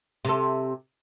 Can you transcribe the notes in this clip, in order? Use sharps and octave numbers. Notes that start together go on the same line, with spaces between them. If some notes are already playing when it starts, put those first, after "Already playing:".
C3 A4